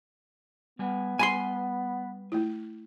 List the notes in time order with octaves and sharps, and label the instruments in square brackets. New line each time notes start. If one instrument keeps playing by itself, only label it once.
[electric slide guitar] G3 G#5 [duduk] B3
[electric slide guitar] G3 B4 [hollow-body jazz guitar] G#5 B5 C6
[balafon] A3 E4